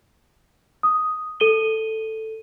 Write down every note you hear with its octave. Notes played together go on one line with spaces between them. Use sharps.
D#6
A4 D#7 G7